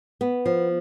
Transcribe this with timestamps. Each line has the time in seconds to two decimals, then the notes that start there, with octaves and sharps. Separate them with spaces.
0.21 B3
0.46 F3